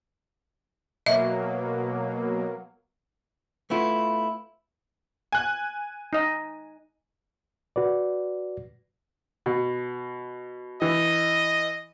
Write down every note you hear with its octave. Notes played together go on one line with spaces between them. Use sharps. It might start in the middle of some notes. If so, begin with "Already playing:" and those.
B2 F#3 A#3 D#5 E5
A3 B3 E4 F4
G#5 F#6
D#4 D#5
F#4 B4 D5
B2
E3 D#5